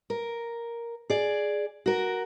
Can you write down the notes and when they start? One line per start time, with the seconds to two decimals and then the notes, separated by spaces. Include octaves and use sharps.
0.10 A#4
1.10 G#4 D5
1.86 F#4 A#4